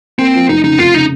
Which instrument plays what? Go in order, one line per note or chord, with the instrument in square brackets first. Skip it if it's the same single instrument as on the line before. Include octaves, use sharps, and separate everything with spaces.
[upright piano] A#3 [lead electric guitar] C4
[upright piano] F3
[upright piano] F1 [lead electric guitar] D#4
[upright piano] C#3 [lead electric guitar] D#4
[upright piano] F1 [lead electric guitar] F4
[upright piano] C#3 [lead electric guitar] D#4